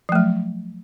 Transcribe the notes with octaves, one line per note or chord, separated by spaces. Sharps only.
F3 F#3 A3